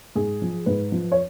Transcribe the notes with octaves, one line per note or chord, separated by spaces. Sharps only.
G#2 G#4
F3
G#2 B4
F3
C#5